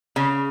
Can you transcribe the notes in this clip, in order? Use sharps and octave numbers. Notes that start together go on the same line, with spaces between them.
C#3